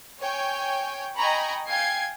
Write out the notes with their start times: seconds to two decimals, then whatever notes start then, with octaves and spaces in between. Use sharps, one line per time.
0.21 C#5 G5 G#5
1.15 D#5 G5 G#5 A#5 B5 C#6
1.67 F5 G5 G#5 G#6 C7